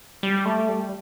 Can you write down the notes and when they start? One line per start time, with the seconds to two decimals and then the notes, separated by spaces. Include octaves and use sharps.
0.23 G3
0.45 A3
0.69 G3